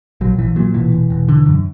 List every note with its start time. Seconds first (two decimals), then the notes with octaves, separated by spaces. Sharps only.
0.21 A#1 F#3
0.38 A#1 E3
0.56 A#2 F#3
0.74 E1 E3
0.92 E1
1.10 E1
1.28 D3
1.46 F#2